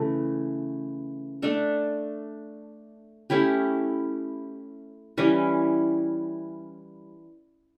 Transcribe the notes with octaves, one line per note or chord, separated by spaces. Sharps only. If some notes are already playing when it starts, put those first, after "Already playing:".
Already playing: C#3 E3 A3
A3 D4 A4
A3 C#4 E4 G4
E3 G3 C#4 E4